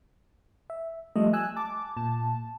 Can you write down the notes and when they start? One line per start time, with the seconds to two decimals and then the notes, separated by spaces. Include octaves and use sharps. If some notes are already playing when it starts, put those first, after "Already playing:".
0.70 E5
1.16 F3 G3 A3 D#5
1.33 G#5 E6 F#6
1.56 A5 D6
1.97 A#2 A5